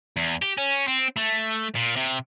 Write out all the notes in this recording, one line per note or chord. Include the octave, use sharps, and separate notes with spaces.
E2
G4
C#4
C4
A3
A#2
C3